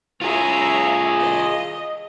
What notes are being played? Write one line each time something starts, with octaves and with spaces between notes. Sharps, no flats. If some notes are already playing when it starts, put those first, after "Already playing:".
F4 G#4 C#5 E5 A#5
D#5